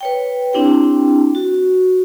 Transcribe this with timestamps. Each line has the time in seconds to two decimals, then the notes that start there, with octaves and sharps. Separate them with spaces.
0.01 B4 C#5 G5
0.53 C4 D4 E4 G4 G5
1.35 F#4